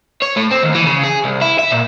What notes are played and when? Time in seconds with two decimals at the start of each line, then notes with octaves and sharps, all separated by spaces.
0.22 C#5
0.36 A2
0.51 C4
0.63 D#2
0.75 E3
0.86 C#3
1.03 G#4
1.24 C2
1.41 E4
1.59 E5
1.71 A#2